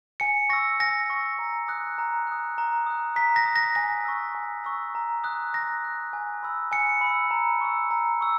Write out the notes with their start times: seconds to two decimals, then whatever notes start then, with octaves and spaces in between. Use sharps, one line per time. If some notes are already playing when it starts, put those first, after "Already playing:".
0.20 G#5 C#7
0.49 C#6 E6 A#6
0.80 G#5 A#6
1.10 C#6 E6
1.39 A#5
1.68 D#6 F#6
1.98 A#5
2.27 D#6 F#6
2.58 A#5
2.86 D#6 F#6
3.16 A#5 B6
3.36 A#6
3.46 D#6 F#6
3.56 A#6
3.75 G#5 A#6
4.05 C#6 E6
4.35 G#5
4.64 C#6 E6
4.95 A#5
5.24 D#6 F#6
5.53 A#5 A#6
5.84 D#6 F#6
6.13 G#5
6.43 B5 E6
6.72 G#5 C#7
7.01 B5 E6
7.31 A#5
7.61 C#6 E6
7.91 A#5
8.21 C#6 E6